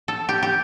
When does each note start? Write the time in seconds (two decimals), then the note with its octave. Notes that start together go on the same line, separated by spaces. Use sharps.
0.08 A4
0.29 G4
0.43 G4